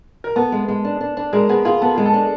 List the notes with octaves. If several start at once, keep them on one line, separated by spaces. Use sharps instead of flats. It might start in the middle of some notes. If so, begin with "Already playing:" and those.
A#4
B3 A4
G#3
G#3
D4
D4
D4
G#3 G#4 A#4
B3 G#4
F4 G#4
B3 A4
G#3 G#4
A4
D4